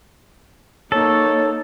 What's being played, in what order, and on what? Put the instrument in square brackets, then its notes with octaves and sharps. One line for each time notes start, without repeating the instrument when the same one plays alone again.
[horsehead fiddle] A#3 D#4 [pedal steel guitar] A4 [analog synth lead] C#5